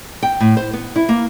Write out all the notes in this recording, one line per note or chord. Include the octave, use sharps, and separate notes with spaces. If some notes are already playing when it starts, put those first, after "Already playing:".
G5
A2
C5
B3
E4
A#3